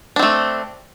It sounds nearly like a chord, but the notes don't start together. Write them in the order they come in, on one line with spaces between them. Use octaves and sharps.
D4 C4 A3